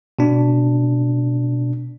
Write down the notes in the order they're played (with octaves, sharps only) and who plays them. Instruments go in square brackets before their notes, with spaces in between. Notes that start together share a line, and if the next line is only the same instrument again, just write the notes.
[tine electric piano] B2 D4